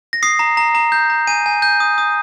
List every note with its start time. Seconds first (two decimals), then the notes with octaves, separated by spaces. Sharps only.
0.13 A#6
0.23 D#6 C7
0.39 A#5
0.57 A#5
0.75 A#5
0.92 G6
1.10 A#5
1.27 G#5 D#7
1.46 G#5
1.62 G6
1.80 D#6
1.98 D#6